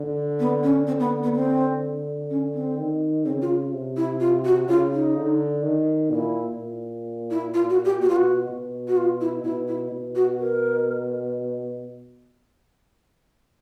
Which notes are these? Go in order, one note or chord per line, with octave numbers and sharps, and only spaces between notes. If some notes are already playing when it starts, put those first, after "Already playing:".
Already playing: D3
B3
C#4
D3 C4
B3
B3
C4
C#4
C4
D#3
C#3 C4
F4
C3
E4
F4
F#4
C#3 F4
D#4
D3
D#3
A#2 E4
A#2
E4
F4
F#4
G4
B2 F#4
F4
F#4
B2
F#4
F4
E4
B2 E4
E4
B2
F#4
A#4